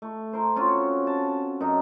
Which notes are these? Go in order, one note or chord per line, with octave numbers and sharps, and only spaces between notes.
A3
A#4 C5
C4 C#4 F4 F#4
A5
F#2 D#4 A4